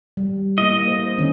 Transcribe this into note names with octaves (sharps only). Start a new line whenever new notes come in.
G3
A#3 E4 D#5
A#4 C5
D3 D#3 C#4